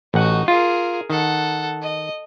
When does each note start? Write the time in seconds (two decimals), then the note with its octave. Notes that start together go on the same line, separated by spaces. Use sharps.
0.14 A1 D#4 F#4 F#5
0.48 F4 G#4 A#4
1.10 D#3 A4 F#5
1.82 D#5